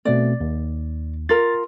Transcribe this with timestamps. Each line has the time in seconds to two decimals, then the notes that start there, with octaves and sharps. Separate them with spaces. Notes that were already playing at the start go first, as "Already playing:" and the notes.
0.05 B2 A3 C4 D5
0.41 D#2
1.29 F4 A#4 A6